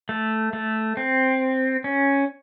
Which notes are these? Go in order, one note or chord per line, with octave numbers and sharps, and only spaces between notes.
A3
A3
C4
C#4